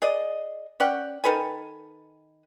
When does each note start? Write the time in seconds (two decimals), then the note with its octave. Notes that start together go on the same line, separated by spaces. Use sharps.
0.02 G#4 D5 D#5
0.80 C#4 D5 F#5 G5
1.24 D#3 A4 B4 G#5